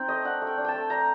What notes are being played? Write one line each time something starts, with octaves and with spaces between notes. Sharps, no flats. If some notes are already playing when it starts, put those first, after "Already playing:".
Already playing: C4 D#4 G5
A3 D#5
D4 F#5
A3
G5
D4
G5 A5
A3
D4 A#5